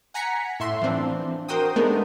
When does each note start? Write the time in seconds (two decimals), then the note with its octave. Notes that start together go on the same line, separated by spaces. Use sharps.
0.14 F#5 G#5 A#5 B6 C#7
0.60 A2 E5 C6
0.82 E3 F3 C4 D4
1.48 F#4 A#4 C5 G5 D#6
1.76 G#3 A3 B3 D4 D#4 A#4